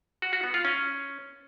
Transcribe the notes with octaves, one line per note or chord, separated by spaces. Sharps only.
F#4
F#4
B3
F4
C#4